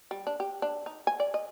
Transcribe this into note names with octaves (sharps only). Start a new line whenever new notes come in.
G3
D4
G4
D4
D#4
G#5
D5
D#5